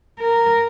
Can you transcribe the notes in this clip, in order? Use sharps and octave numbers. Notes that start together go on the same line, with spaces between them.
A#4